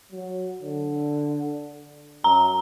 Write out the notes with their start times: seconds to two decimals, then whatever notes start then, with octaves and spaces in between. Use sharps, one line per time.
0.12 F#3
0.62 D3
2.24 F#2 A#5